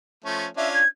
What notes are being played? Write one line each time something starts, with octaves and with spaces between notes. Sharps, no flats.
F3 A3 C#4
C#4 D4 F4 E5
G#6